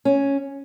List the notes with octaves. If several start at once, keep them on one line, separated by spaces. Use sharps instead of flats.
C#4